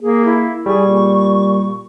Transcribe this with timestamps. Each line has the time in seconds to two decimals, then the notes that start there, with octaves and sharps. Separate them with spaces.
0.01 A#3 G#4
0.25 E4
0.66 G3 G#4 C#6
0.87 A#2